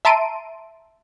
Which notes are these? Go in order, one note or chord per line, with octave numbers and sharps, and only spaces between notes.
E5 A5 A#5 C6 D7 D#7